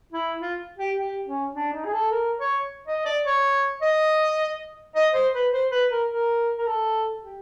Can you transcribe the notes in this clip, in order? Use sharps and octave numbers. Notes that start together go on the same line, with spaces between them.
E4
F4
G4
G4
C#4
D4
D#4
G#4
A4
A#4
C#5
D#5
D5
C#5
D#5
D#5
C5
B4
C5
B4
A#4
A#4
A#4
A4
G4